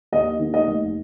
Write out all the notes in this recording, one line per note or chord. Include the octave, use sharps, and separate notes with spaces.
D#2 D#5
D#3
D#5
F1